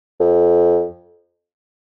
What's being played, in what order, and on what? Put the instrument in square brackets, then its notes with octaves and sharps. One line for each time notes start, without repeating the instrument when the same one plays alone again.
[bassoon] F2